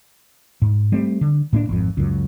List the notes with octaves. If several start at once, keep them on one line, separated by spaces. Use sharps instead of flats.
G#2
G3 A3 C4
D3
A2 A#3 D4
G#1 F2
C#2 F#2